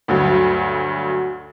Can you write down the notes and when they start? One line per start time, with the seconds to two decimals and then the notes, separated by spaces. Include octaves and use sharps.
0.08 D2 G2 F#3